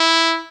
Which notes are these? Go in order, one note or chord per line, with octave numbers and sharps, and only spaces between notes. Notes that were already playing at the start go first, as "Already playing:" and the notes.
Already playing: E4